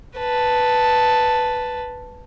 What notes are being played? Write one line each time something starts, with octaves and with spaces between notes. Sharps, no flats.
B4 A5